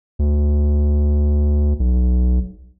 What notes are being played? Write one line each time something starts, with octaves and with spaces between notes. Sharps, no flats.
D2
B1